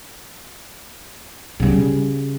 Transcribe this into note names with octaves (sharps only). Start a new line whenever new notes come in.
C#3 G3